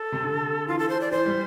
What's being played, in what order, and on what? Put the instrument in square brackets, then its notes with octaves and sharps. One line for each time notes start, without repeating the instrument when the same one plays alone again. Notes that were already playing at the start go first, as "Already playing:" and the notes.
Already playing: [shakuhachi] A4
[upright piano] C3
D3
[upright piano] E3 [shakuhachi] F4
[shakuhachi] A4
C5
D5
[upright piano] E3 [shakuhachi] C5
[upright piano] G3